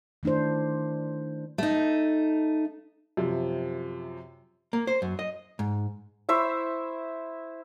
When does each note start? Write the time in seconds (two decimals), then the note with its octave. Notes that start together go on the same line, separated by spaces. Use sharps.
0.23 D#3 A3 D4 E4 C5
1.58 A3 D#4
3.17 F#2 C3 F3
4.73 A#3
4.87 C5
5.02 F#2
5.19 D#5
5.59 G#2
6.29 E4 C5 E5 C#6